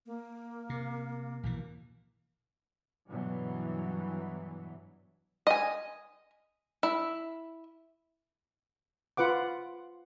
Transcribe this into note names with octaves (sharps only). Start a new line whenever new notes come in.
A#3
C3
A#1 B2 E3
G2 B2 E3 F#3
D#5 G#5
E4
F4 B4 F#5 D6